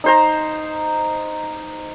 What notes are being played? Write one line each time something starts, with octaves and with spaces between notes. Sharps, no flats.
D#4 C5 A#5